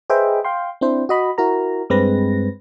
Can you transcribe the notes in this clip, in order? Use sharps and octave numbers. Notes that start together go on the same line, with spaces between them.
G#4 B4 C5 D#5 E5 G5
F5 G5 C6
C4 D4 E4 C5
F#4 D#5 B5
E4 F#4 A#4 A#5
G2 G#3 C4 B4 A#6